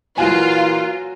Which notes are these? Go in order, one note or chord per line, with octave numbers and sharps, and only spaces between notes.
A#2 E3 F#3 A#3 F4 F#4 G#5